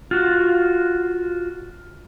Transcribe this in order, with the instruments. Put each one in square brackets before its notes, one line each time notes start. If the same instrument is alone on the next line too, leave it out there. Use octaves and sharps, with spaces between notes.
[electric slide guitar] F4 F#4